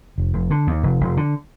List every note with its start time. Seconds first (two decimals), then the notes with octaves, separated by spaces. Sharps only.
0.18 F1
0.34 F1
0.51 D3
0.67 D#2
0.83 F1
1.01 F1
1.17 D3